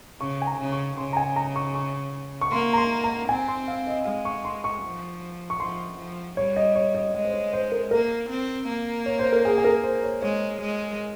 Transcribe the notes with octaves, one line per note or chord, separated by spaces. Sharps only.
C#3 C#6
G#5
A#5
C#3
C#6
C#3 C6
A#5
G#5
A#5
C#6
C#6
C#6
A#3 C6
A#5
C6
A#5
C4 G#5
C6
F5
D#5
G#3 F5
C#6
C6
C#6
F3
C#6
F3 C6
F3
G3 C#5
D#5
C#5
D#5
G#3 D#5
C5
C#5
C5
A#4
A#3 A#4
C4
A#3
C#5
C5
A#4
G#4
G#4
A#4
C5
C#5
G#3 C#5
G#3